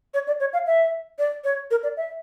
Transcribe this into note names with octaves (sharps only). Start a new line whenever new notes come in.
C#5
D5
C#5
F5
E5
D5
C#5
A#4
D5
E5